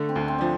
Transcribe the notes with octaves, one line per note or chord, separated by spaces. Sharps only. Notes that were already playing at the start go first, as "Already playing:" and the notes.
Already playing: D3 A3
C4
D2
C4
F3 D4